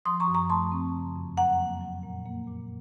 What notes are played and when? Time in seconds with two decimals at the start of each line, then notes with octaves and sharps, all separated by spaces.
0.05 F3 C6 D#6
0.20 A#5 C#6
0.27 F#2
0.34 A#5 C#6
0.50 A3 A5 C6
0.72 C4
0.94 C#3
1.16 F2
1.37 F#3 F#5 A#5
1.59 A#3
1.81 F#3
2.03 A#2
2.26 A#3
2.47 A#2